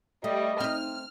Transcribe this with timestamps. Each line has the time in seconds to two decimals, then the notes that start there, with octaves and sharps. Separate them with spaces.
0.24 G3 A3 D#5
0.60 C4 D#4 F6